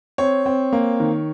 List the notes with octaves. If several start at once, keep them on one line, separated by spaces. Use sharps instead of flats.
C4 C#5
C4
A#3
D#3